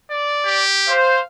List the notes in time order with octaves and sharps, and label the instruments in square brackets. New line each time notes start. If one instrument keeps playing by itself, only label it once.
[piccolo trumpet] D5
[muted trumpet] G4
[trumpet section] C5 [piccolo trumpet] F5